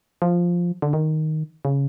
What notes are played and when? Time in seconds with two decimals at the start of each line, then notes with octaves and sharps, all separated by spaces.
0.22 F3
0.82 D3
0.93 D#3
1.65 C#3